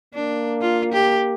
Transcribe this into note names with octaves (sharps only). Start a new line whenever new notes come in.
A#3 D4
F4
G4